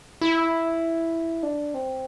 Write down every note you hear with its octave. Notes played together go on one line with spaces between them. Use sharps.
E4
D4
C4